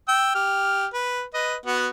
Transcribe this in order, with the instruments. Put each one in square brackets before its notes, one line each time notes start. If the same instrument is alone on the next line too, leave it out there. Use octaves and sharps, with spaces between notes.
[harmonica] G5 E6
G4 F6
B4
B4 D#5
B3 F#4 F#5